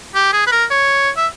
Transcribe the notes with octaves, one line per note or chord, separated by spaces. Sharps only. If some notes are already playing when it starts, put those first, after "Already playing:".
G4
G#4
B4
A#4
C#5
E5